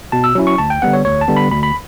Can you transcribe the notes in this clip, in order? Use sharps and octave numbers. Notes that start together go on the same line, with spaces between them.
B2 A5
E6
F#3 C#4 E4
C#6
D2 A5
G5
D3 G3 B3 F#5
C#5
D2 C#5
A5
D3 G3 B3
B5
D2 B5
B5